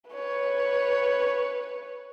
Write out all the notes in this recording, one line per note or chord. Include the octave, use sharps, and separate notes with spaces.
B4 C#5